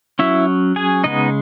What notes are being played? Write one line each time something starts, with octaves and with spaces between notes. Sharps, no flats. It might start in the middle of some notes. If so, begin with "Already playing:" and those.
F#3 C#4 E4 E5
G#4 G#5
C#3 G#3 B3 D#4 D#5